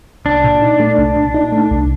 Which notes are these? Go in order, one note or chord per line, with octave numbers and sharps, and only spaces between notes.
C2 D4
A#2
D#4
A3
C2
A#2
D#4
A3
C2